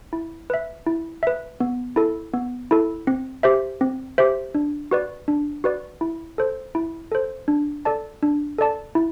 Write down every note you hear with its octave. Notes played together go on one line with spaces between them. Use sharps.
E4
B4 E5
E4
B4 E5
B3
E4 A4
B3
E4 A4
C4
G4 C5 E5
C4
G4 C5 E5
D4
F#4 B4 D5
D4
F#4 B4 D5
E4
A4 C5
E4
A4 C5
D4
A4 D5 A5
D4
A4 D5 A5
E4